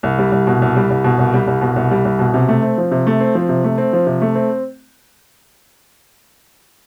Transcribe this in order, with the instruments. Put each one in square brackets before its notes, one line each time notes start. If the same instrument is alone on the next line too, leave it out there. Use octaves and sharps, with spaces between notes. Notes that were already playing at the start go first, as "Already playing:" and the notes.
[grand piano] C2
G3
C2
B2
C2
G3
C2
B2
C2
G3
C2
B2
C2
G3
C2
B2
C3
A3
C4
F3
C3
A3
C4
F3
C3
A3
C4
F3
C3
A3
C4